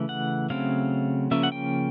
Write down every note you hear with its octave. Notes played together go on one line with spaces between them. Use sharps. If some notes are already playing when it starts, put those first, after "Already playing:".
Already playing: C#3 E3 A3
F#5
C#3 F#3 A3 C4 F5
C#3 F3 A#3 C#4 E5
F#5
G5